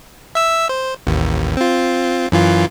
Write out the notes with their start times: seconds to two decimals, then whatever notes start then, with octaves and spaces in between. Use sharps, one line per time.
0.35 E5 E6
0.69 C5
1.07 A1 D#2
1.57 C4 F4
2.32 F#2 E3 F4